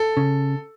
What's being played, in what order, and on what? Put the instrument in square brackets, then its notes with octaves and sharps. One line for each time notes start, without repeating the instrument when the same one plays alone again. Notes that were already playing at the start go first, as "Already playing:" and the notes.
Already playing: [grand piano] A4
[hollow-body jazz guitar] C#3